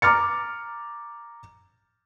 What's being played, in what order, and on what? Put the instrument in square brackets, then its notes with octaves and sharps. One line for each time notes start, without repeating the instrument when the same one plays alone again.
[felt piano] A#5 D6 F6 A6 C#7